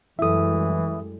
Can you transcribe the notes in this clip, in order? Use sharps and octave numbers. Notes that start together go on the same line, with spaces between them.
F#2 E3 G3 G#3 E4 A4 E5 D#6